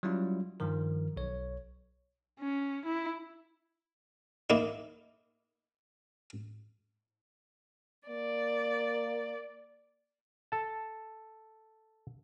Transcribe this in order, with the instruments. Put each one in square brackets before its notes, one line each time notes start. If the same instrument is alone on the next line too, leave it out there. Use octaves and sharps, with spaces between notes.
[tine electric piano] F#3 G3 C#4 E4 F4
G2 D#3 F3 A#4
B1 C#5
[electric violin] C#4
E4
[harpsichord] A#3 D#4 E4
[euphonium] A#3 [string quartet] D5
[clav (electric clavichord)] A4 A5